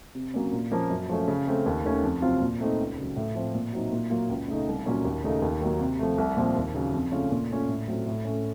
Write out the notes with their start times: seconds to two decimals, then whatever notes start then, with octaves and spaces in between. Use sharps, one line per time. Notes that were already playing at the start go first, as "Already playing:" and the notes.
0.15 C3
0.34 F#3 A#3 C#4
0.53 A#2
0.72 F3 A#3 C#4
0.90 F#2
1.09 F3 A3 C#4
1.28 C#3
1.47 A3 C4
1.66 D#2
1.85 D#3 A3 C#4
2.03 F2
2.22 C3 F#3 C4 F4
2.41 A#2
2.60 A3 C4 D#4
2.79 C#2
2.98 C#3 F#3
3.16 A2
3.35 F3 C4 F4
3.55 A#2
3.73 F#3 C4 D#4
3.92 A#2
4.10 F#3 A#3 F4
4.29 C#2
4.48 C#3 A3 D#4
4.68 C2
4.86 A#2 F#3 A#3 C#4
5.05 D#2
5.24 C#3 A3 D#4
5.42 D#2
5.61 D#3 F#3 A#3
5.80 C3
5.99 F3 A3
6.18 C2
6.37 A#2 F3 C4 F4
6.56 D#2
6.75 C#3 F#3
6.94 F2
7.12 C#3 A3 C#4 F4
7.31 A#2
7.50 A3 C#4 F4
7.69 A2
7.88 F#3 A3 C4 F4
8.06 A2
8.25 A3 C#4